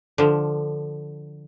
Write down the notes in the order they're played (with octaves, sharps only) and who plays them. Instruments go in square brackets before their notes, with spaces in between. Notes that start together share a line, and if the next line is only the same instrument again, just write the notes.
[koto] D3 F3